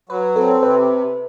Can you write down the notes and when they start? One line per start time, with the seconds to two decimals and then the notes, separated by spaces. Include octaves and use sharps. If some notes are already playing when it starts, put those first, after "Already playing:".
0.09 F#3 B4
0.36 C4 A4
0.63 C3 B4